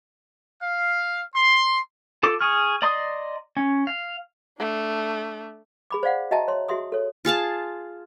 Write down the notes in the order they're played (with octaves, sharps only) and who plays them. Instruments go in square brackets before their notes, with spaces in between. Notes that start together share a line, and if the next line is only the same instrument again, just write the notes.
[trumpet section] F5
C6
[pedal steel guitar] F4 A4 D6
G#4 C#6 F6
D5 D#5 A#5 C6 D#6
C#4
F5
[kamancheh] A3 D4
[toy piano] G#4 B5 D6
C5 D5 F5 F#5
F#4 D#5 E5 G5 A5 A#5
C#5 C6
F#4 G#4 E5 C6 D#6
A4 C#5
[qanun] F4 G#4 F5 A5